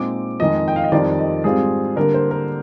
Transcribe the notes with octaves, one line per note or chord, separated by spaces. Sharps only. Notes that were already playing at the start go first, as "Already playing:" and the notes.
Already playing: A#2 G#3 C4 D#4 D6
F2 D#3 G#3 D#5
G5
F5
D#5
F2 D#3 G3 C4 D5
D#5
G#2 G3 C4 F4 G#4
D3 G3 A#3 A#4
C5
A#4